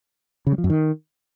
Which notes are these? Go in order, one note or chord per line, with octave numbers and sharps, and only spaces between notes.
C#3
G3
F3
F#2
D#3